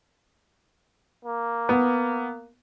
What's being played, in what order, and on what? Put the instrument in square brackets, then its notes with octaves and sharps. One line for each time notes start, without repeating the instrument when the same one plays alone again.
[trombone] A#3
[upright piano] B3